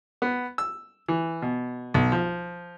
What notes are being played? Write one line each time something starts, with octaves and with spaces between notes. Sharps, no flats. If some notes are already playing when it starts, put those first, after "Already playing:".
B3
E6
E3
B2
B1
F3